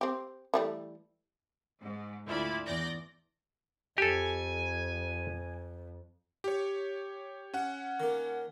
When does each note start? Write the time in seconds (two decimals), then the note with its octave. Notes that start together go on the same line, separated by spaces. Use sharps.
0.01 C4 G4
0.54 E3 G3 A3
1.80 G#2
2.26 D2 E4 F4 D5 B5
2.66 E2 D5 G6 A#6
3.98 F2 G4 A4 G#5
6.44 G4 C#5
7.54 C#4 F#5
8.00 D#3 A#3